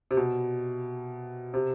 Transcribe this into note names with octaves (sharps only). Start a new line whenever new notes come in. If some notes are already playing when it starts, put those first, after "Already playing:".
C3
B2
C3